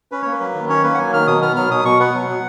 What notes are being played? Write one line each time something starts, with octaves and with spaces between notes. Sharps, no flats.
C#4 B4
A#3 C#5
B4
F#3
D#3
C#4 C#5
A#3 B4
F#5
F#3 G#5
D#3 F6
B2 D#6
B3 F6
F#3 F6
B2 D#6
B2 C#6
B3 F#5
F#3
B2